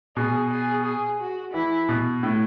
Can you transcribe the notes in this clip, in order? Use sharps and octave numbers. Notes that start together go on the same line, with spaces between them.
B2 G#4
G#4
G#4
F#4
E3 E4
B2
A2